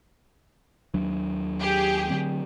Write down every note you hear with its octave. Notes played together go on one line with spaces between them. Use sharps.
D#2 F#3 D4
G4 G#4
D3 F#3 C4